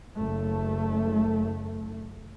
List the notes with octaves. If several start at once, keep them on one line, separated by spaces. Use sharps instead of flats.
F#1 A3